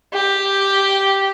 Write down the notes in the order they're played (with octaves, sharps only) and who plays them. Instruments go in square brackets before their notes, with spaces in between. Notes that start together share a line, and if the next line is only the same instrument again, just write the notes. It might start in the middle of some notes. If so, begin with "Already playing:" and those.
[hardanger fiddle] G4